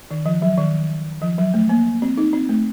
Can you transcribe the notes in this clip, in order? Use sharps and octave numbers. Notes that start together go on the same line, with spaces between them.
D#3
F3
F#3
D#3
F3
F#3
A3
A#3
C4
D#4
C4
A3